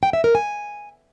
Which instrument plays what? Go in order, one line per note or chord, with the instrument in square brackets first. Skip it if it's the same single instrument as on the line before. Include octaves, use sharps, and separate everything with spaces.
[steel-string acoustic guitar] G5
E5
A#4
G#5